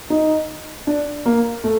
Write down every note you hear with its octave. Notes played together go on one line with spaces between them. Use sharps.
D#4
D4
A#3
A3